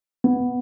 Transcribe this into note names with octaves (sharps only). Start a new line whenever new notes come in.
B3